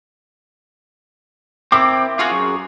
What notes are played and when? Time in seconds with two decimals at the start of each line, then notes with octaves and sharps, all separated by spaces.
1.72 C4 E4 A#4 D6
2.19 F4 F#4 G#4 C#6 F6
2.31 F#2